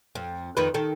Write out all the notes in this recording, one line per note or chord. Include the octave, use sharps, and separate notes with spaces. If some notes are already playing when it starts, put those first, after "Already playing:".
F2
F2 D#3 B4
D#3 A4